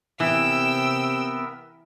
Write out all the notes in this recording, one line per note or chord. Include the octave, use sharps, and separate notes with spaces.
C3 E3 B3 A#4 E5 G5 E6